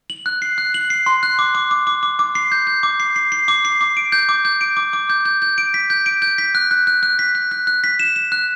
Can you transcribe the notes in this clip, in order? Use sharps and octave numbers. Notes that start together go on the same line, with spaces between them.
F#7
F#6
C7
F#6
F#7
C7
C6
F#6
D6
D6
D6
D6
D6
D6
C7
G6
G6
D6
C7
C7
C7
D6
C7
D6
D7
G6
D6
G6
D7
D6
D6
G6
G6
G6
D7
B6
G6
D7
G6
B6
F#6
F#6
F#6
F#6
B6
F#6
F#6
F#6
B6
E7
E7
F#6